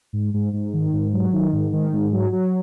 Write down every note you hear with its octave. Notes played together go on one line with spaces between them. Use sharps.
G#2
G#2
G#2
D#3
G#2
F#3
D#3
G#2
D#3
G#2
F#3
F#3